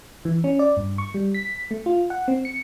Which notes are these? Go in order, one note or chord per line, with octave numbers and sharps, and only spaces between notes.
E3
C#4
D5
G2
C#6
G3
B6
A3
F4
F#5
C4
C#7